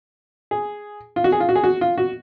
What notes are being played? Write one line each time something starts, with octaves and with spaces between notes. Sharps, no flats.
G#4
F4
F#4
G#4
F4
F#4
G#4
F#4
F4
F#4